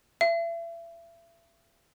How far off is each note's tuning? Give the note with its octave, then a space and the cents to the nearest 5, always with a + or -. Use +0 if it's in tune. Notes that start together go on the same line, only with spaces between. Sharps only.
E5 +35